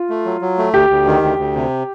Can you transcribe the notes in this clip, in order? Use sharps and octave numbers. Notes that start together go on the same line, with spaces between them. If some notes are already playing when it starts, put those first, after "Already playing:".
Already playing: F4
A3
F#3
F#3
A3
D2 G4
D2
D#3
D2
D2
C3